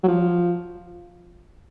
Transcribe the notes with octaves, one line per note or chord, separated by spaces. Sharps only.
F#3
F3